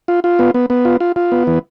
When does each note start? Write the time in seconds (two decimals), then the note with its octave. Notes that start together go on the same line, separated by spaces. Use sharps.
0.08 F4
0.24 F4
0.39 B3
0.54 B3
0.70 B3
0.85 F4
1.00 F4
1.16 F4
1.32 B3
1.47 E3